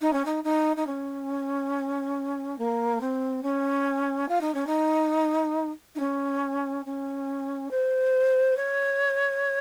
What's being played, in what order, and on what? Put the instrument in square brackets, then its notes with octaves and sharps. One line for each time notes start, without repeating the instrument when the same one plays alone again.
[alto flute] D#4
C#4
D#4
D#4
D#4
C#4
A#3
C4
C#4
F4
D#4
C#4
D#4
D#4
C#4
C#4
C5
C#5